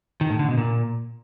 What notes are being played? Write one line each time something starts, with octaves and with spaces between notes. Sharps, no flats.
D#3
A2
D3
B2
A#2